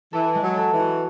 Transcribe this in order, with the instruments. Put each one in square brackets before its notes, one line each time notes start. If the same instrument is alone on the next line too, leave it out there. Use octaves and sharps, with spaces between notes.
[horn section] E3 [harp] A4
[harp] G#3
[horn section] F#3
[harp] A4
[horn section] E3
[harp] F#4